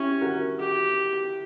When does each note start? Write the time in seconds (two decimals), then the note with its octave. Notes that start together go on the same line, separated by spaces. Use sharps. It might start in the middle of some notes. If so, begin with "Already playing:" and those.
Already playing: C#4 E4 G4
0.21 F#4 A#4
0.60 G4